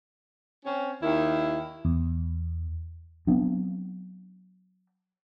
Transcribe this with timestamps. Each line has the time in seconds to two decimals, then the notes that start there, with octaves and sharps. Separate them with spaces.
0.65 C4 C#4
1.01 D#2 D#3 E4
1.85 E2
3.27 F#3 B3 C4 D4